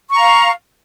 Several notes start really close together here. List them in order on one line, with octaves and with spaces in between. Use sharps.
C#6 A#5 F5